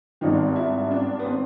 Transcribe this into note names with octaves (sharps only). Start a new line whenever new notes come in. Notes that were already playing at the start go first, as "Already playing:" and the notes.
G#1 G2 D#3 D#4
E4
D4
B3
C4